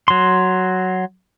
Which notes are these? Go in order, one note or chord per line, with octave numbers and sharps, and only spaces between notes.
F#3 C6